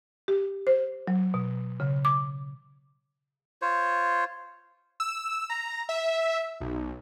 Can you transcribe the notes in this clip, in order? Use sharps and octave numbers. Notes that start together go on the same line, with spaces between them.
G4
C5
F#3
B2
C#3
D6
F4 C5 C#5
E6
A#5
E5
B1